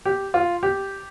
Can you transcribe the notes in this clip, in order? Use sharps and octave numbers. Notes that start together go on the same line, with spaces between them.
G4
F4
G4